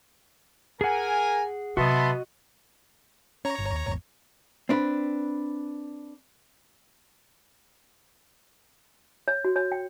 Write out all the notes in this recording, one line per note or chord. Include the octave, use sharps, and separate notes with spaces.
G#4 A#4 F#5 G#5
C3 F#3 B3 F#4 D#5 E5 A5 C6
C#4 C#5 A#5
G1
D#2
G#1 E2
C4 D4 B4
C#5
F#4
C#5
G5